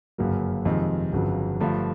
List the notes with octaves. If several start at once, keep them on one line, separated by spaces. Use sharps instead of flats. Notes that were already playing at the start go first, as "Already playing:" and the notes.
G1 F#2 C#3 F#3 A#3
F2 C3 D#3 G#3
G1 F2 C#3 F#3
G2 D3 F3 A3